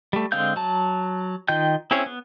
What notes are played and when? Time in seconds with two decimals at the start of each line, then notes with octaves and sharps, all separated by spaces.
0.13 G3 A3
0.32 D3 G#3 C4 F5 G6
0.56 F#3 A5
1.48 D#3 F4 D#5 G5 G6
1.91 C4 C#4 E4 G#4 C#5
2.06 B3